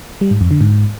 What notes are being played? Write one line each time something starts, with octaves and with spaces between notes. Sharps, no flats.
G3
G#2
F2
D3
G#2